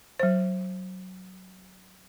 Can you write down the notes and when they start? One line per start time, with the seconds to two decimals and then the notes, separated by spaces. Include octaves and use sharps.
0.20 F#3 C5